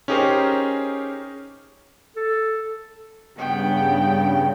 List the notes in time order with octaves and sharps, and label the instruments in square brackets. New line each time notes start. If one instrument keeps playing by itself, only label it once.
[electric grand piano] C#4 D#4 G4 G#4 A#4 C5
[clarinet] A4
[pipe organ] G2 C#3 [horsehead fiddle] B3 G5